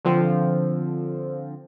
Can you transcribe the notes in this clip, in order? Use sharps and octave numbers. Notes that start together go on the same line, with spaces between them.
D3 F3 C4